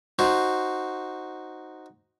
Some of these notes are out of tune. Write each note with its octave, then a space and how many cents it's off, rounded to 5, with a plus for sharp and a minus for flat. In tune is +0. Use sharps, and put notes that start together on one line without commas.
D#4 +0 F#4 +0 C5 +0